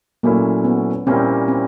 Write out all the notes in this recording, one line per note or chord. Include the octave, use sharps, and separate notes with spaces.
A#2 F#3 A3 A#3 C#4 E4
B3
A#2 G3 A#3 C4 C#4 E4
C4